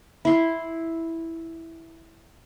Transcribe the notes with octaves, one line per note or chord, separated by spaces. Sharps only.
E4 C6